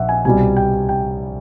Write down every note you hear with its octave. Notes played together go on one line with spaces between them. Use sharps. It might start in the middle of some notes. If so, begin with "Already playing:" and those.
Already playing: A#1 E5 F#5
G#5
C2 B2 G3 G#5
G5
G5